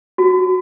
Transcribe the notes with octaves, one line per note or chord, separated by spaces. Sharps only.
F#4